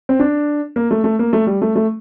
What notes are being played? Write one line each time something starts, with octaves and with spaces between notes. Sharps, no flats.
C4
D4
A#3
A3
A3
A#3
A3
G3
A3
A3